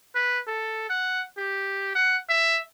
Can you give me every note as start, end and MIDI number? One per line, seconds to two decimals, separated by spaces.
0.15 0.39 71
0.48 0.86 69
0.90 1.23 78
1.38 1.92 67
1.95 2.18 78
2.29 2.61 76